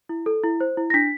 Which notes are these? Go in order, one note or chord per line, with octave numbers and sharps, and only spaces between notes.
E4
A4
E4
C5
E4
A#6
D4 B6